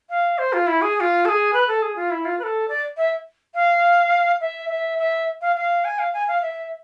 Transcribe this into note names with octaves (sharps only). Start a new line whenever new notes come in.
F5
C5
F4
E4
G#4
G#4
F4
A4
G#4
B4
A4
G#4
F4
E4
F4
B4
A4
D5
E5
F5
E5
E5
E5
F5
F5
G#5
F5
G#5
F5
E5